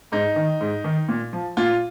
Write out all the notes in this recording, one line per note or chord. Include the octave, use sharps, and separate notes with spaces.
G#2 D#4
D#3
G#2
D#3
A#2
F3
A#2 F4